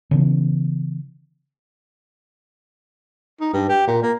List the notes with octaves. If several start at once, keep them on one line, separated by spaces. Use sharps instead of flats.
C#3 E3 B3
D#4
G2
G4
A#2
A#3